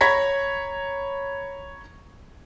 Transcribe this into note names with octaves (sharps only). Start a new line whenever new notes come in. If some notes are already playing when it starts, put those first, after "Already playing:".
C#5 A#5 B5 G#6 A#6 B6